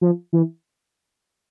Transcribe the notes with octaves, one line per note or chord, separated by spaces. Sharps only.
F3
E3